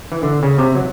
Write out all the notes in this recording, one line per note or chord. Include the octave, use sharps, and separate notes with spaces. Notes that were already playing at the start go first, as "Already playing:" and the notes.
E3
D3
C#3
C3
F#3